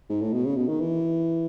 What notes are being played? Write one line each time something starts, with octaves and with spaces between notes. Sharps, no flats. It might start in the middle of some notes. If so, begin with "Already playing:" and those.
G#2
A2
B2
C#3
B2
D#3
E3